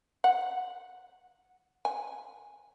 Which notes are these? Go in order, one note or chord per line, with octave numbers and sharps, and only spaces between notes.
F#5
G#5